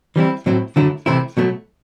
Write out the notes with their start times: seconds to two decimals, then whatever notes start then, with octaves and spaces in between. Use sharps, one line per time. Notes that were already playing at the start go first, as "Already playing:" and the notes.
0.16 E3 G3 C4 E4
0.46 A2 F#3 C4 E4
0.76 F#2 D3 F#3 A3 E4
1.06 C3 E3 A3 C4 E4
1.37 B2 F#3 A3